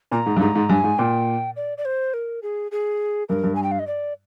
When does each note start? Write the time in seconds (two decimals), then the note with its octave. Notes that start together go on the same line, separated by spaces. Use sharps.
0.11 A#2 A#5
0.26 G#2
0.36 G2
0.41 G#2 A#5
0.55 G#2
0.69 G2 G#5
0.84 G#2
0.98 A#2 G5
1.56 D5
1.78 D5
1.85 C5
2.14 A#4
2.43 G#4
2.72 G#4
3.29 G2 A#4
3.44 G2
3.55 G#5
3.63 G5
3.71 F5
3.79 D#5
3.87 D5